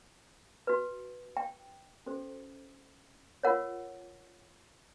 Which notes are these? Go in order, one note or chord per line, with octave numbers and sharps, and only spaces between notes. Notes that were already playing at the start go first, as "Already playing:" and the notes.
F#4 B4
G5
C#4 F#4 A4 C5
F4 A#4 C#5 F#5